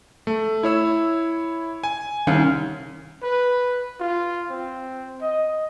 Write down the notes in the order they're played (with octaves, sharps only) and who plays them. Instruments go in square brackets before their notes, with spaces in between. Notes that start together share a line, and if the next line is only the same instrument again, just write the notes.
[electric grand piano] A3
E4 C#5 E6
G#5
[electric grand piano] C2 [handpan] D#3 C#4 F5
[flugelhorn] B4
F4
C4
D#5